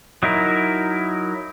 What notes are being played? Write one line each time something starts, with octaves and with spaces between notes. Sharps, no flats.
F#3 D#4 E4 A#4